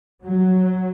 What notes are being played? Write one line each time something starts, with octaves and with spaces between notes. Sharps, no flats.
F#3